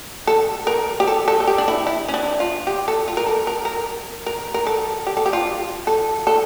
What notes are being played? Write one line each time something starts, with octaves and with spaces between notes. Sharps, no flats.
A4
A#4
G4
A4
A4
A4
G4
D4
E4
E4
C#4
D4
F4
G4
A4
F4
A#4
A4
A#4
A#4
A#4
A#4
A4
G4
A4
G4
F4
A4
A4